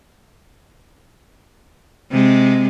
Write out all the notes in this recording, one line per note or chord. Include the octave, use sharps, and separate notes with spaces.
C3 G#3